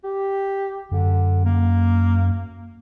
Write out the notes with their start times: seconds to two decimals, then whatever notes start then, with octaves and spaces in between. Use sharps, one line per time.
0.04 G4
0.92 F#2 D3
1.45 A#3